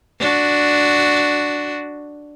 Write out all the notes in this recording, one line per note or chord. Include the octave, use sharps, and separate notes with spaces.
D4 F#4